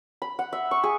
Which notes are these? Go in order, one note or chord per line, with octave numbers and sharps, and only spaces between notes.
B5
F#5
E5
C#6
G#4